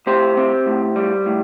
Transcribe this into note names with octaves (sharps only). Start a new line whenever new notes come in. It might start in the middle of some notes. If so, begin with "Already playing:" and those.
A2 G4 C5
C4
A2
G3
A2